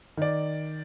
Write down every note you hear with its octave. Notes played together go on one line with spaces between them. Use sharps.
D#3 D5